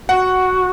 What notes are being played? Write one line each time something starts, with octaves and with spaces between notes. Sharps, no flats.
F#4 F#5